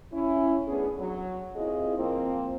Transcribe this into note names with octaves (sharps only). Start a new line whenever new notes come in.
C#4 E4
A3 B3 C#4 D4 G#4
F#3
D#2 C4 E4 F4 G#4 D#5
F3 A#3 C4